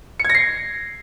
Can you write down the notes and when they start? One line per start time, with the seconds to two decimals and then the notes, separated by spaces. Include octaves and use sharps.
0.20 C#7
0.25 G#6
0.30 A#6
0.35 C7